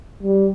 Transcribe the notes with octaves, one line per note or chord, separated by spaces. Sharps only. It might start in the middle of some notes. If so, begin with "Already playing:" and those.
G3